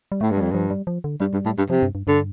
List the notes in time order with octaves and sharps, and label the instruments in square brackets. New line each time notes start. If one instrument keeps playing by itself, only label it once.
[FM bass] G3
[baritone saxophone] A2 [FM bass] A3
[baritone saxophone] G2
[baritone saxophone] F2 [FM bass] G3
[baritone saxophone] G2 [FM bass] F3
[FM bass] G3
F3
D3
[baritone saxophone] G2 [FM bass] G3
[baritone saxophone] G2
A2
G2
[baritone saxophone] C3 [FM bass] F3
[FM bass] G2
G2
[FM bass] G2 [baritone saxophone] D3